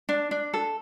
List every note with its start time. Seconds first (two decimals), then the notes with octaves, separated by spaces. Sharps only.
0.09 D4
0.31 D4
0.53 A4